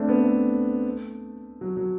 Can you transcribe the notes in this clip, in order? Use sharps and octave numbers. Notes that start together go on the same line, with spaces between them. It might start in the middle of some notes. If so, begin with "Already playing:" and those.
Already playing: A3 C4 D4
B3
A3
F#3
F#3